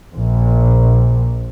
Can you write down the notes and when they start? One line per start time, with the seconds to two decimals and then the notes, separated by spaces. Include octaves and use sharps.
0.14 A#1